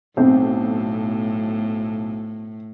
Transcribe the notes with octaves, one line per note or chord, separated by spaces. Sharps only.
B1 A2 C4